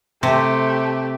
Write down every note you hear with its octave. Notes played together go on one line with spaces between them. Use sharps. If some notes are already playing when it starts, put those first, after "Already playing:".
C3 A3 G4